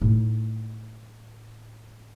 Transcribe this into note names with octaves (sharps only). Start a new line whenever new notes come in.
A2 D#4